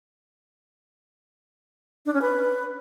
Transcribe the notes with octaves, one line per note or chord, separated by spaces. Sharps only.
D4
C#4
B4